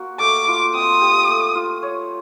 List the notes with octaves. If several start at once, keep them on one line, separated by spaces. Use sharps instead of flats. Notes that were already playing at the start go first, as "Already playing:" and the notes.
Already playing: A#3 F#4
A3 D6
F4
C4 D#6
G4
A3
F4
C#5